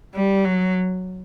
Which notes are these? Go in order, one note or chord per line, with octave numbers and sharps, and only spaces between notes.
G3
F#3